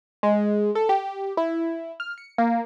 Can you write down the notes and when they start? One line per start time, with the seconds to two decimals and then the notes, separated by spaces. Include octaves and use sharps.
0.23 G#3
0.75 A4
0.89 G4
1.37 E4
2.00 F6
2.18 C#7
2.38 A#3